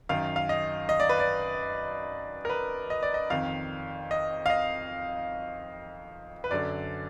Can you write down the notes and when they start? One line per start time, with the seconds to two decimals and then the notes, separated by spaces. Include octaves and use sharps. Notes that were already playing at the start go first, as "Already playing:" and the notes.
0.09 F#2 D#3 F5
0.36 F5
0.49 D#5
0.89 D#5
1.00 D5
1.09 B4
1.19 D5
2.45 A#4
2.50 B4
2.90 D#5
3.03 D5
3.14 D#5
3.30 F2 D#3 F5
4.11 D#5
4.46 F5
4.50 D#5
6.44 B4
6.51 F#2 D3 D5